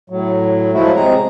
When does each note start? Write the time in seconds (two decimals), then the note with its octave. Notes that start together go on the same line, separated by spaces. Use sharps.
0.10 A2 F#3
0.73 F3 F#3 G#3 A3 E4 F#4
0.95 C3 G#3 C4 G#4 A#5